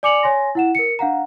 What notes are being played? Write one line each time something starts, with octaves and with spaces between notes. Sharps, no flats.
D5 G#5 D6 C#7 F7 F#7
C#5 G#5 C6 A#6
E4 F#5 E7
A#4 C#7
D4 F5 F#5 A#5